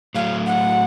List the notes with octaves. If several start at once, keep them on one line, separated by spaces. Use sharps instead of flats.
A2 F#3 A3 F5
F#5